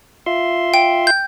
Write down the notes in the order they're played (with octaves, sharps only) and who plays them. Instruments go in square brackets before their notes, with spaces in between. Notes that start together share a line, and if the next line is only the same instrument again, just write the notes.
[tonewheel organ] F4 E5 C6
[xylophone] G5
G6